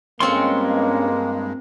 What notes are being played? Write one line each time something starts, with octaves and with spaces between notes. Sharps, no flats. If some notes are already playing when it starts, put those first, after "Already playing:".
G2 G#3 A#3 C4 C#4 F4 C#5 C6